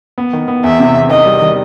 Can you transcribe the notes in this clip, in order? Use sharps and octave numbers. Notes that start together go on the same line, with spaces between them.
B3
D#3
B3
E2 E5
C3
E2
D#3 D#5
G3
D#3